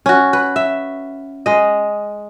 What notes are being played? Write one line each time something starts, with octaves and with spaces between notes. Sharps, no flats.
C#4 F#4
B4
E5
G#3 D#5